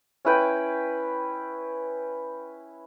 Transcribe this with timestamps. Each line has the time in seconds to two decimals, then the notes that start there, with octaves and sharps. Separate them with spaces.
0.25 C#4 E4 B4 G5